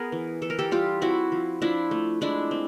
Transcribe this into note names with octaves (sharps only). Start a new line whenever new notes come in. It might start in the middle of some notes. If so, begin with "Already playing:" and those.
Already playing: B3 G#4 A#4
E3
E3 A4
A#4
G4 A4
G3 F4 G4
C4 E4 F#4
F3
F3 D4 E4
A3
G#3 D4 E4
C4